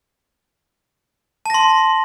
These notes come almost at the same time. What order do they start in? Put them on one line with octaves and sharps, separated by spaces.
A5 A#6 C6